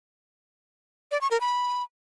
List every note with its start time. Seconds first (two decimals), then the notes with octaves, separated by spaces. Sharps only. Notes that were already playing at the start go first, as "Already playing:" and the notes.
1.11 D5
1.21 C#6
1.31 A#4
1.41 B5